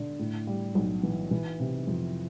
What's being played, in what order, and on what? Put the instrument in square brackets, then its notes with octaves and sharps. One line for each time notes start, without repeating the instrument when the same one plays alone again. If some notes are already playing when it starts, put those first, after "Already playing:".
Already playing: [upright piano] D3
A2
G3
B1
E3
E3
C3
F2